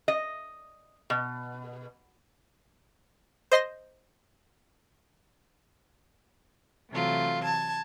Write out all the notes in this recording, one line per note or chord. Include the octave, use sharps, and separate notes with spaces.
D#5
B2
C5 D#5 C6 A#6
C3 E3 F#3 A3 F4
A5 G#6